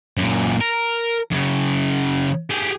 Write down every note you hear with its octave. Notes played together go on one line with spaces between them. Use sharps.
F#2 A#2
A#4
F#2 C#3
G4 G#4